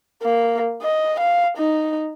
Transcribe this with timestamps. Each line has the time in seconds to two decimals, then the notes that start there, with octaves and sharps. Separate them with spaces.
0.23 A#3
0.82 D#5
1.20 F5
1.57 D#4